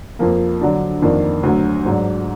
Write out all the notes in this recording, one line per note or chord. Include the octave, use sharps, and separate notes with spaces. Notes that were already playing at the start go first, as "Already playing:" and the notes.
F2 F3 A#3
D3 F#3 D4
F2 D#3 A#3 D4
D2 D3 F#3
G#2 F#3 D4